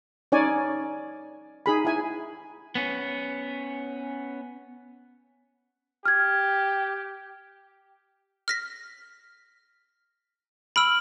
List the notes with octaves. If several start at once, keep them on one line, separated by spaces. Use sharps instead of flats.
C#4 D#4 C#5 D5 G#5
D#4 G#4 B5
E4 G#5
B3 C#4
G4 F6 G#6
F6 A#6 B6
B5 E6 F6 D7 F#7